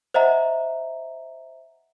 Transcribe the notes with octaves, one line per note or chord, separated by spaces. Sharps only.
C5 D#5 E5 F#5 A#5